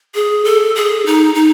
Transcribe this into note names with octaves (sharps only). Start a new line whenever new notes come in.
G#4
A4
G#4
D#4
D#4